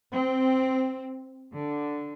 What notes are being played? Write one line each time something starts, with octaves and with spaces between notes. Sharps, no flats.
C4
D3